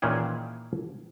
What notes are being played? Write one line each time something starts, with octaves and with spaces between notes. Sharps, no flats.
A#2 D#3 E3 C#4 G#4 G5